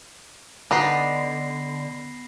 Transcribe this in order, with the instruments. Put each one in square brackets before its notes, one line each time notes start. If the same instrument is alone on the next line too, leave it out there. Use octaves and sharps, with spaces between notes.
[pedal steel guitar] D3 [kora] B3 [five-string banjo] D4 D#4 B4 [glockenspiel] B5 A#6 C7